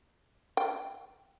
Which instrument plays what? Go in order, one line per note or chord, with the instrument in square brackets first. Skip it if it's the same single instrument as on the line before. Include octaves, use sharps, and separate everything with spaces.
[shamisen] G5